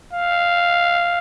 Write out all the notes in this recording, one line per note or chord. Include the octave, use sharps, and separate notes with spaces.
F5